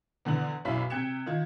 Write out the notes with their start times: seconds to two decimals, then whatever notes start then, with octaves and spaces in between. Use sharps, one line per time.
0.25 E2 D3 B4 F#7
0.65 B1 F#2 E4 F5 B5 B6
0.90 C3 G5 F#6 G#6 C#7 E7
1.26 D#3 F4 G#6